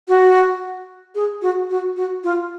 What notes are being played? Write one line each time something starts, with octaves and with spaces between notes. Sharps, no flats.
F#4
G#4
F#4
F#4
F#4
F4